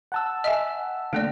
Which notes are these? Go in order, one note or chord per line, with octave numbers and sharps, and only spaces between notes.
F#5 A5 E6
D#5 E5 G#5
D3 A3 A#3 D5